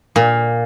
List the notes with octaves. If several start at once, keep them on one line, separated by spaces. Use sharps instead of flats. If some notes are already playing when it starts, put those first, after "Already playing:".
A#2